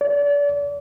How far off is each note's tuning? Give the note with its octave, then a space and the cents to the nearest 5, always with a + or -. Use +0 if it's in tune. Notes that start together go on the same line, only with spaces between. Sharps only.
D5 -35